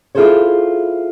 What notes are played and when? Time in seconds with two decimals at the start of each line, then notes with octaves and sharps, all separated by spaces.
0.15 E4 F4 G#4 A4 C5 C#5